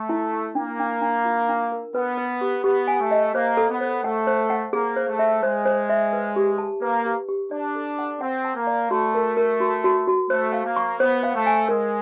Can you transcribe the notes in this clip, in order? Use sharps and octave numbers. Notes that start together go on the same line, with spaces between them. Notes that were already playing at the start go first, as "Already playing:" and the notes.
Already playing: A3
E4
E4
A#3 D4
D4
D4
F4
D4
A#4
B3 B4
B4
G4
B3 G4
G#5
A3
D#5
A#3 C5
A4
B3
C5
A3 F#5
C5
F#5
A#3 G#4
C5
A3
E5
G#3 C5
C5
E5
B4
G4
A5
A#3 B4
G4
G4
D4 D5
A4
F#5
C4 F#5
A5
A#3
D5
A3 F#4
A#4
A#4
F#4
F#4
F#4
A3 C5
F5
A#3
C#6
B3 C5
F5
A3
G#5
G#3 A#4